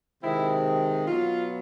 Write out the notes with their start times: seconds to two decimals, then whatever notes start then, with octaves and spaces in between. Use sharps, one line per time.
0.22 C3 D#3 G#3 C4 E4
1.05 B2 F#3 B3 F4